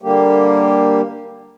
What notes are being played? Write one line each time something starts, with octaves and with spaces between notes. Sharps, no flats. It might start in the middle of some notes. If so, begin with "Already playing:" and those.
D3 G3 A#3 G4